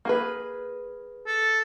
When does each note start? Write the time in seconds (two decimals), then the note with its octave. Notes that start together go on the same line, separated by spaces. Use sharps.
0.05 A#3 G#4 B4
1.27 A4